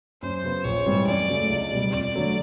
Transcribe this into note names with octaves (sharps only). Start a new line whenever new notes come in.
F#2 C5
C#3 F#3 B3
A#1 C#5
G#2 E3 G3 C4
F#2 D5
C#3 F#3 A3
C#2
B2 G3
F2 D5
D3 F#3 A3